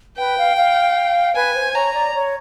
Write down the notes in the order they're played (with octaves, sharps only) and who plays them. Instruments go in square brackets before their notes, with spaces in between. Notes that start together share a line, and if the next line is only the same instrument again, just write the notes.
[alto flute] B4 [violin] G5
[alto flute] F5
F5
[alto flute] B4 [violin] G#5
[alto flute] C5
[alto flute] C#5 [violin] A#5
[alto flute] D5
C#5